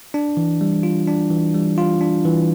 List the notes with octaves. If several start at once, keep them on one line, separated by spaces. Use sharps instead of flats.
D4
E3
G3
F4
D4
E3
G3
F4
D4
E3